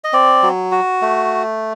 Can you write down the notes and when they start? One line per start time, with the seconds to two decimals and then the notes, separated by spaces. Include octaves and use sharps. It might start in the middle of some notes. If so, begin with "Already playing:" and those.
0.04 D#5
0.13 C4 D5
0.43 F#3
0.72 F#4
1.02 A3